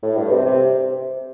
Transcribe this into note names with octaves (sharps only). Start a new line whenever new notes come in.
A2
G2
C3
C3